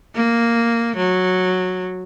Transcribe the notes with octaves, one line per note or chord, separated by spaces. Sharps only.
A#3
F#3